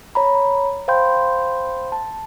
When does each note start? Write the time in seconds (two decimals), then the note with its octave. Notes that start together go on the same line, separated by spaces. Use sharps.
0.15 C#5 A#5 B5
0.88 C5 F5 G5 B5 C6 G6
1.92 A5